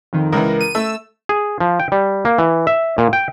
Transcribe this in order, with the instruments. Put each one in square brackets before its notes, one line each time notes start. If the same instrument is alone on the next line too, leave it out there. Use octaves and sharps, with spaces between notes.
[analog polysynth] F2 D#3
[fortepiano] C#2 E3 [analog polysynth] A#4
[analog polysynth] D#7
[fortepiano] A3 [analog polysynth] E6
[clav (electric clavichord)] G#4
F3
G5
G3
A#3
E3
E5
A#2
G5